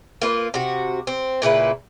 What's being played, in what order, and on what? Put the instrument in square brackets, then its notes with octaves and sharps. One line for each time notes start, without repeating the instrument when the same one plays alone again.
[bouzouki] A#3 F4 B4
C3 F#4
C4
A#2 C#3 E4 B4